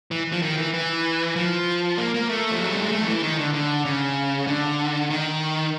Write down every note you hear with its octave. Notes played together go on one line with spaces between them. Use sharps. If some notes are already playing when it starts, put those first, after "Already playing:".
E3
F3
D#3
E3
E3
F3
A#3
A#3
A3
F3
F#3
G3
G#3
A3
F3
E3
D#3
D3
D3
C#3
D3
D#3